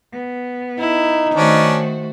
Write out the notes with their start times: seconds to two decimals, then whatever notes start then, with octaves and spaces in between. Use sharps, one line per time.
0.11 B3
0.79 D#4 E4
1.35 D#3 A3 C#4 D4 F#4 C5